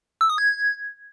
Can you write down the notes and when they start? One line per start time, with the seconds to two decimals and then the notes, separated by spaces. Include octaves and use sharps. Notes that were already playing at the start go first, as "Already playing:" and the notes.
0.21 E6
0.30 D#6
0.38 G#6